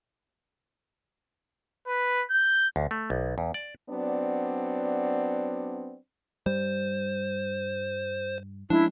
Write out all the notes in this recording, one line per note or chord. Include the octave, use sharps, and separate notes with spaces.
B4
G6
D2
A3
B1
E2
D5
F#3 B3 C4 D4 D5
G2 G3 C5
F3 G#3 C#4 D4 E4